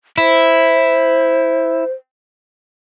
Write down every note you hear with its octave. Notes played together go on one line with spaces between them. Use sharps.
E4 C5